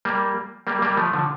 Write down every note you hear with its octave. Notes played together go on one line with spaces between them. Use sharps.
G3 A#3
G3 A#3
G3 A#3
F3 A3
D3 F3